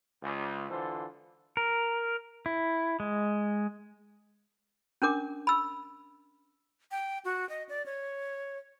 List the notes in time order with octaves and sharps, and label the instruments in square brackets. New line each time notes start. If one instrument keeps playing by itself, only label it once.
[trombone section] C#2
D3 E3 F4 A4 C5
[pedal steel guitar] A#4
E4
G#3
[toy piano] C#4 D4 A#4 D6
B5 E6
[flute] G5
F#4
D#5
D5
C#5